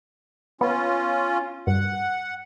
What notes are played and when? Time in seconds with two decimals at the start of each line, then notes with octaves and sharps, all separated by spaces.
0.61 B3 C#4 F4
1.67 G2 F#5